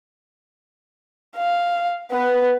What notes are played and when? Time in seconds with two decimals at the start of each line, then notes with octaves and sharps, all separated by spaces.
1.36 F5
2.11 B3 B4